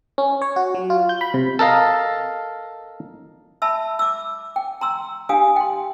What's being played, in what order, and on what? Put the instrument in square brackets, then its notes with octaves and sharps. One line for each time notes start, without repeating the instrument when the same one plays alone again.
[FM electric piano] C#4
C#5
F#4
F#3
F4
G6
B5
C3
[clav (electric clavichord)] A4 A#4 D#5 F5
[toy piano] E5 A5 B5 E6
D6 E6
G5
A#5 C6 E6
D4 G4 F5 G#5 D#6
G5 C6